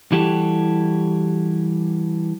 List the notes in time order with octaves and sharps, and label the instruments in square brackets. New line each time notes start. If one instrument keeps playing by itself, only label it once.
[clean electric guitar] E3 G3 E4 F#4 G4 A4